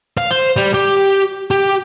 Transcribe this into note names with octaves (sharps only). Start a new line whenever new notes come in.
F5
C5
G3
G4
G4